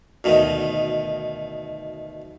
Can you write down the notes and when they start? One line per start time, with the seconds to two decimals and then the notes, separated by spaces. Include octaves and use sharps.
0.24 D2 B2 D#3